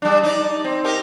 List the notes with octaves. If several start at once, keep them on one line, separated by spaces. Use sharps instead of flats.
G3 D4
D#4 D5
C4
D#4 G4 A#4